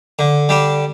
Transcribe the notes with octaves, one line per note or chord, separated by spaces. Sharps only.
D3
G3 D4